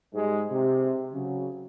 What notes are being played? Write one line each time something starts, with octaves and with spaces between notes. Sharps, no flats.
G#2 G3 G#3
C3
C#3 F#3